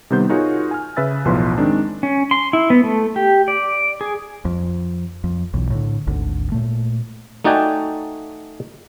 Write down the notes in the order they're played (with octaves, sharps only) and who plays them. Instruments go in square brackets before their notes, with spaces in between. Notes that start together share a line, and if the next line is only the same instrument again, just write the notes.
[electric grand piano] C3 D#3 G3 B3 C5 G6
D#4 F4 F#4 G#4 A#4 C#5
G#5 F6
C#3 B4 E5 E6 A6
B1 E2 A2 F3 B4 C6
D#3 G#3 C4 D4
[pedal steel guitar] C#4
C6
E4
B3
A3
G4
D5
G#4
[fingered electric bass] F2
F2
B1 E2
A2 D3
G#1 D2 D3
A#2 A3
[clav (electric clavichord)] A3 D#4 F#4 D5 G5 G#5